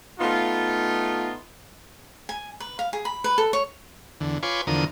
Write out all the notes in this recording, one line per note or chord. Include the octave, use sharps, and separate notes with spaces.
A3 B3 D#4 F4
G#5
B4
F5
G#4
B5
B4
A4
C#5
E2 D3
F4 B4 C#5 G#5 C6 D6
E2 D3 F3 A#4 D#6